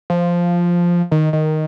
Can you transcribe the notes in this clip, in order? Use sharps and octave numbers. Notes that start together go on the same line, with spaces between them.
F3
D#3
D#3